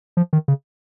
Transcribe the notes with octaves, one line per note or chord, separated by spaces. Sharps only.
F3
D#3
C#3